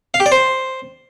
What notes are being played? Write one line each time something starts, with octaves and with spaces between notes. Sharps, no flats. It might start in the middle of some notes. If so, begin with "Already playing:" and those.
F5
G4
D5
C5